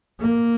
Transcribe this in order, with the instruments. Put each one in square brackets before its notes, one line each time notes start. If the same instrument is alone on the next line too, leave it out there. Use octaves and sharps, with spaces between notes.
[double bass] A#3